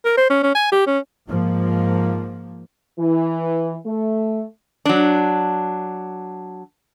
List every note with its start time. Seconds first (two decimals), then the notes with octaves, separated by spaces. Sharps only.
0.05 A#4
0.17 C5
0.30 C#4
0.43 C#4
0.55 G#5
0.72 G4
0.87 C#4
1.28 G#2 F3 A#3
2.99 E3
3.86 A3
4.86 F#3 D4